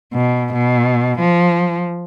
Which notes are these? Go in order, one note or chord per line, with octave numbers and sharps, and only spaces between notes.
B2
B2
F3